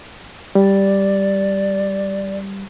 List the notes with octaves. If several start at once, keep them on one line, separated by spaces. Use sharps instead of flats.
G3 D5